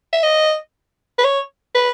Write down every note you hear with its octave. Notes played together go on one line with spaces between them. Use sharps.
E5
D#5
B4
C#5
B4